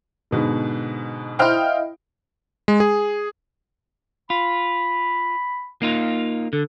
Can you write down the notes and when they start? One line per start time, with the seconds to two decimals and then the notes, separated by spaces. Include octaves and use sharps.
0.31 G#2 B2 D3
1.39 E4 C5 D#5 F5 G5 F6
2.68 G#3
2.80 G#4
4.30 F4 B5
5.82 A#3 D#4 F4
6.53 D3 A4